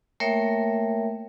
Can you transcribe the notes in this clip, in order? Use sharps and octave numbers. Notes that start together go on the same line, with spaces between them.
A3 A#3 A#4 C#5 E5 G5